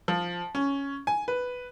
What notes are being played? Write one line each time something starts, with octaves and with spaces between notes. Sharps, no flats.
F3
C#4
G#5
B4